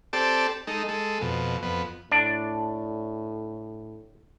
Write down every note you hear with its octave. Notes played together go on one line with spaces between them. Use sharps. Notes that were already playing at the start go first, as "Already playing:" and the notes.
C4 G4 A4 D5 A5
G#3 D#4 A4
G#3 A4
F2 B2
F2 B3
A2 D4